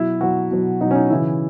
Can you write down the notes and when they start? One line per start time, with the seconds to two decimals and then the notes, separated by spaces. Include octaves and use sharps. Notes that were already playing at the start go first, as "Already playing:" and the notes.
Already playing: B2 F#3 E4
0.21 B2 F#3 F#4
0.51 B2 F#3
0.81 B2 F#3 D#4
0.91 C#4
0.95 D#4
1.10 C#3 E3 E4